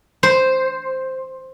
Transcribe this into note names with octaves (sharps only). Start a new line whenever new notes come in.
C5